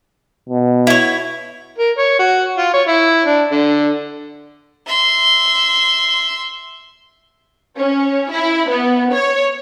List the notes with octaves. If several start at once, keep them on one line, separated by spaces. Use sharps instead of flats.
B2
E4 C#5
A#4
C#5
F#4
F4
C#5
E4
D4
D3
E5 C6
C#4
E4
B3
C#5